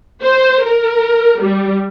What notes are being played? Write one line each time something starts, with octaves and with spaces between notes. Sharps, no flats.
C5
A#4
G3